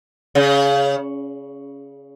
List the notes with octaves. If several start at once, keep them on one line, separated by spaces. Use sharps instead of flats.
C#3